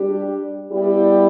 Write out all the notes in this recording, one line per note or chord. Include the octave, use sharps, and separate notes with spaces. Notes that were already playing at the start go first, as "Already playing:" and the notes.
Already playing: G3 D4 G4
G3 B3 E4 G4